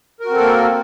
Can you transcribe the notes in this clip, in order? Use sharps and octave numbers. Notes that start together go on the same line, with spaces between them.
A#3 C4 F#4 A4 A#4